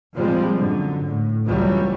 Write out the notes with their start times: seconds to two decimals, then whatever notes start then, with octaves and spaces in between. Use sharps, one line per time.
0.15 A#2 F3 G3 G#3 C4
0.58 F#2 D3
1.04 A2
1.45 F#1 C#2 E3 F#3 G3